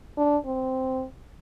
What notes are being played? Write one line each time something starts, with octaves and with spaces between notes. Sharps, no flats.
D4
C4